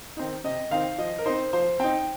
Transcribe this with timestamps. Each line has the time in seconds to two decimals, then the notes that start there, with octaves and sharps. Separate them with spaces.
0.17 D#3 C4 D#4
0.44 C3 D#5
0.71 D#3 C4 D#4 F5
0.98 F3 D#5
1.18 A#4
1.26 C4 D#4 C5
1.53 F3 C5
1.80 C4 D#4 G5